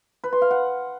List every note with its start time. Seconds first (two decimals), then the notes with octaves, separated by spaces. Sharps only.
0.24 B4
0.33 C6
0.42 F5
0.51 F#5